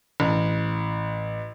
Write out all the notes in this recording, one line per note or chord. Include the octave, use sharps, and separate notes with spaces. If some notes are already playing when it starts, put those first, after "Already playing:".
A1